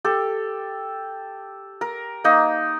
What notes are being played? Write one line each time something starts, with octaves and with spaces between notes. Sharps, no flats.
G4 A4
A#4
A#3 D#4